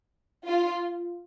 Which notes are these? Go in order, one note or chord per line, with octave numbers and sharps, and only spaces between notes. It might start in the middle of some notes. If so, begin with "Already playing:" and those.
F4